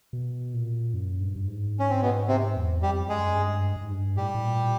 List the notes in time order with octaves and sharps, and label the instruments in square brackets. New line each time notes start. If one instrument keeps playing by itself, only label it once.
[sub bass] B2
A#2
F#2
G2
G2
G#2
[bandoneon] C#4
C4
B2 B3
C3 C4
[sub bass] E2
[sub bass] F2 [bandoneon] G3 G4
[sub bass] F#2 [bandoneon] G#3 G#4
[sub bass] G2
G2
G#2
G2
[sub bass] A2 [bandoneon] G3 G4
[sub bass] A2
A#2